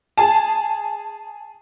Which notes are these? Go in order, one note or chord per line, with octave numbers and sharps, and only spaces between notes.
G#4 A5